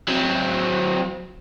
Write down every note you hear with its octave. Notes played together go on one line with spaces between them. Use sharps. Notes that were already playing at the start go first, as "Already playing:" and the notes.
F#3 C4